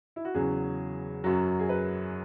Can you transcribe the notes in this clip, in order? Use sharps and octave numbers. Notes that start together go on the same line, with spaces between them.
E4
F#4
E2 C#3 F#3 G#4
F#2 F#3
G#4
B4